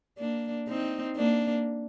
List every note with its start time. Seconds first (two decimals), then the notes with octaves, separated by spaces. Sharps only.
0.18 A#3 D4
0.68 C4 D#4
1.17 A#3 D4